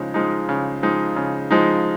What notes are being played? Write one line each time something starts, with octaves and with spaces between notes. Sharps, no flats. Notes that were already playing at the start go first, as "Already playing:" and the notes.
Already playing: C#3 F3 G#3 D#4
F3 G#3 D#4
C#3
F3 G#3 D#4
C#3
F3 G#3 D#4